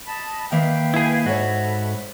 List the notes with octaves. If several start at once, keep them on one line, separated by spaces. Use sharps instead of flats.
D#5 A5 B5
D#3 A#3 B4 E5 F5 G5
E4 G#4
G#2 F#4 A4 C#5 D#5 E5 B5